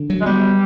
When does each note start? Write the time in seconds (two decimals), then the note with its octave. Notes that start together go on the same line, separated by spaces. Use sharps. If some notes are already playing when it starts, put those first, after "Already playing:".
Already playing: D3
0.10 F#3
0.21 G#3
0.26 G3 B3